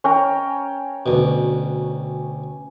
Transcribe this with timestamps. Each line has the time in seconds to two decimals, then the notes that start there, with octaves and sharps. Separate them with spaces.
0.04 C#4 G5 A#5
1.06 D2 B2